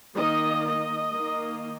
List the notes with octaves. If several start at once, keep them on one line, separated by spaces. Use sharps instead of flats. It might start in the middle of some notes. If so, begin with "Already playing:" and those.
D#3 A#3 D#5
D#5
D#3 A#3